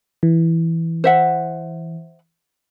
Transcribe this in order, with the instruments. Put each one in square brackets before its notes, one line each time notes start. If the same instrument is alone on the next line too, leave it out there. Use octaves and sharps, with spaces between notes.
[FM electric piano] E3
[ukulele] C5 E5 F#5